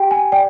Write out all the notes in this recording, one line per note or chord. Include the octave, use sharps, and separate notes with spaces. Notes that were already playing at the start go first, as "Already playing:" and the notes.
Already playing: G4 G5
G#5
D5 G5